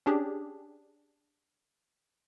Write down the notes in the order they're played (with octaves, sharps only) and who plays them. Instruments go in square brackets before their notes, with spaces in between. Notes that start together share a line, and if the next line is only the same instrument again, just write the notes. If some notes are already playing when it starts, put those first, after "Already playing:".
[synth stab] C#4 D4 G4 G#4